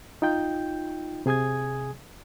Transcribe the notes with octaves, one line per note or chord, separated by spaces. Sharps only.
D#4 F4 G5 G6
C3 G#4 G#5 D#6 G#6